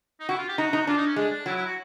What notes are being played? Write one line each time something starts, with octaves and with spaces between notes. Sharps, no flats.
D#4
E4 F#4
F4
G4
D#4 F#4
D#4
D4 F4
D#4
C#4
G#3 D4
D4
F#3 E4
E4
F#4